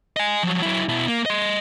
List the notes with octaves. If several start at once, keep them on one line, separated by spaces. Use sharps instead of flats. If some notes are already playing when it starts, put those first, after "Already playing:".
D#5 G#5
F3 F#3
F#3 E4
B2 E4
A#3
D#5 C6